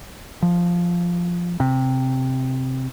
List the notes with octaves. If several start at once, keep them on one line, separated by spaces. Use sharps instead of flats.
F3
C3